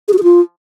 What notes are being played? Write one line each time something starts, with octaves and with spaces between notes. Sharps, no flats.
G#4
F#4
G#4
F4